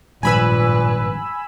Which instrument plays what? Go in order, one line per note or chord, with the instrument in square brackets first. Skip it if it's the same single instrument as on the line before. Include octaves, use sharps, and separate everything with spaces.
[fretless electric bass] G#1 G2 F3 [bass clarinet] A#2 [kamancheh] B4 [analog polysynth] G#5 B5 E6